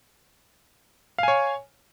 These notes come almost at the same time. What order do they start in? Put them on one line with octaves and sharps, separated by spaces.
F5 G#5 C#5